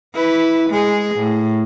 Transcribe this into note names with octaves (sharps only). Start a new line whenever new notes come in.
E4 B4
G#3 G#4
A2